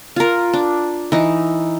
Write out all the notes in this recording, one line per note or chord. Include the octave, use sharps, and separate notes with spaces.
F4 A#4
D4
E3 D#4